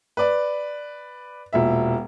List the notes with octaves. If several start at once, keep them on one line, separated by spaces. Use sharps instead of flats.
B4 D5
E1 A#2 E5